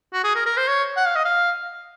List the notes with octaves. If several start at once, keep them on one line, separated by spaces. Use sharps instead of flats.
F#4
G#4
A#4
A#4
C5
C#5
F#5
F5
D#5
F5